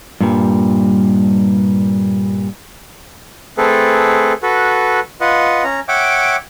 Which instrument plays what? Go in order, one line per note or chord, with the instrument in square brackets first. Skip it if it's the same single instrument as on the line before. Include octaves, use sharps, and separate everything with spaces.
[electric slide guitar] G2 A#2 G3
[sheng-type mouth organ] A3 C4 G#4 A4 B4
F#4 A4 B4
F4 B4 D#5 F#5
C#4 A#5
C#5 E5 F#5 G5 D6